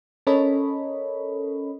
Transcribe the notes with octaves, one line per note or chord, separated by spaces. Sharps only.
C#4 A4 A#4 C#5 D#5 B5